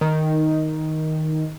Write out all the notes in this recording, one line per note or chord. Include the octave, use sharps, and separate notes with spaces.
D#3